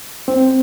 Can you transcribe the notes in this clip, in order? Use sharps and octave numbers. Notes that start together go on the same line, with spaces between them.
C4